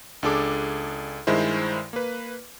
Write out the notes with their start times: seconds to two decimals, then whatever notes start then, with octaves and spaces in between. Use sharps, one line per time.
0.23 C#2 D4 G#4 A4 D6
1.27 G2 D#3 G#3 E4 C5
1.93 A#3 B4